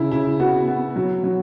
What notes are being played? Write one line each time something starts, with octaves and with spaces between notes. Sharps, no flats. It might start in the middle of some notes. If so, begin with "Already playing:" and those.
Already playing: C#3 E4
C#3 E4
B3 F#4
B3
F#3
F#3